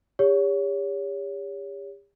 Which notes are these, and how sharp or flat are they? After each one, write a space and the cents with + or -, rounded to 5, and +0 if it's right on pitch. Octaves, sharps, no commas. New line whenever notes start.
G4 +40 C#5 +25